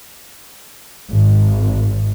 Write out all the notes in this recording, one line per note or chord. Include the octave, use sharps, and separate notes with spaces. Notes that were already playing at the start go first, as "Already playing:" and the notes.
G#1